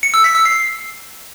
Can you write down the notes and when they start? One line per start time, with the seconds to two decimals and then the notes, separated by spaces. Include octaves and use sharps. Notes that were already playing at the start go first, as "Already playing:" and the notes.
0.03 C#7
0.14 E6
0.24 B6
0.35 E6
0.45 C7